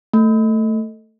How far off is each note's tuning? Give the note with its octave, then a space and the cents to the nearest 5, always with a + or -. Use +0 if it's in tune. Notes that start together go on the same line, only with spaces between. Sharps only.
A3 +10